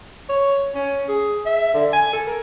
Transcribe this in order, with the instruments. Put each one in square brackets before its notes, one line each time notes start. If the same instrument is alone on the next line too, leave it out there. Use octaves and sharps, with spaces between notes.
[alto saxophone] C#5
C#4
G#4
E5
D3
G#5
A4
A#4